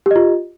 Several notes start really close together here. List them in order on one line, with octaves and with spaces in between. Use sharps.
G4 D#5 F4